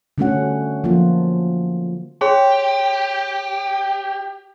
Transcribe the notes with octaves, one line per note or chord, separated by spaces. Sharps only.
D3 G3 A3 C#4 F#4 F#5
F3 F#3 A#3 F4
G4 G#4 C#5 C6